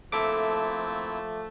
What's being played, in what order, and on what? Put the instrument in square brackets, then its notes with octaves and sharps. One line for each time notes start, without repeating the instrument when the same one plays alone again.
[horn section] F3 A3 [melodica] A#3 C4 E4 [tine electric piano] A4 E5 D6